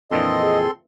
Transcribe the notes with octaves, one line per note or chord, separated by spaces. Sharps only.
F2 A#2 E3 C4 D4 A4 D#5 C6
G#4